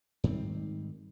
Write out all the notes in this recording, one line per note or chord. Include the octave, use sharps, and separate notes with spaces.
G#2 D#3 G3 C4